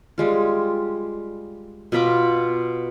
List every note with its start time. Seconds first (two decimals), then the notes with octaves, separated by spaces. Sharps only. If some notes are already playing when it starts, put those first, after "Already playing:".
0.18 G3 G#3 F4
1.92 B2 F4 B5 D6